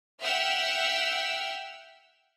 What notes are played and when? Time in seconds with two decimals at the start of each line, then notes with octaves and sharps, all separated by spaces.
0.22 E5 F#5 G5 E6 F6